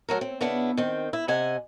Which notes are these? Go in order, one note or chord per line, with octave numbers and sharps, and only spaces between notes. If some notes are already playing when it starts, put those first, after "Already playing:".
F#3 A3 A#4
C4
C#3 B3 D4 E4
D#3 C4
E4
C3 D#5 F#5 G#5